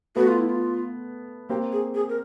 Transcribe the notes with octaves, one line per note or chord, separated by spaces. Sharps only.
A3 B3 F#4
F4
E4
F4
A#3 C4 G4
G#4
G#4
A#4